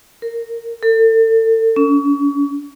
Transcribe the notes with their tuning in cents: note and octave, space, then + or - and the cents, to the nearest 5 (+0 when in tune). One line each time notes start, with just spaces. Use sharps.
A#4 -10
A4 +35
C#4 +35